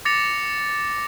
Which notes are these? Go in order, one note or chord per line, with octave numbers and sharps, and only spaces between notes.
D6 A6 A#6 C#7 F7